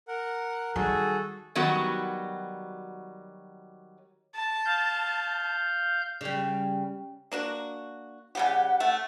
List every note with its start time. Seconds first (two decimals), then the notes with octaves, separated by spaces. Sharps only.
0.08 A#4 F#5
0.76 D#3 G3 F#4 G#4 A4
1.55 D#3 F#3 G3 B3 F#4
4.34 A5
4.65 F5 G6
6.21 C#3 G3
7.32 A#3 D4 F#4
8.35 C#3 G3 G4 F#5
8.80 A3